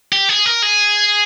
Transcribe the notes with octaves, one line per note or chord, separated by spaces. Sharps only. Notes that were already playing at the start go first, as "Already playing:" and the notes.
G4
G#4
A#4
G#4